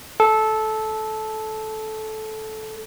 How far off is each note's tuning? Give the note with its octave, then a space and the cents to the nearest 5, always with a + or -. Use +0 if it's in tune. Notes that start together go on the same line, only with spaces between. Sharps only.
A4 -15